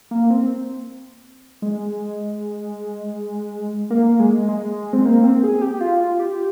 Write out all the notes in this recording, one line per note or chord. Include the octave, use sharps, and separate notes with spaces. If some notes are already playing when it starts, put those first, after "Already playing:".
A#3
C4
G#3
A#3
G#3
G#3
C4
A#3
C4
G#4
G4
F4
F4
G4